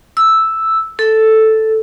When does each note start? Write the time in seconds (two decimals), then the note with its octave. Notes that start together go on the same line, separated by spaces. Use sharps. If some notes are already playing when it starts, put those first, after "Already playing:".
0.17 E6
0.99 A4